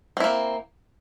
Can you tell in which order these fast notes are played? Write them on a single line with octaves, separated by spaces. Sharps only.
C4 E4 A#3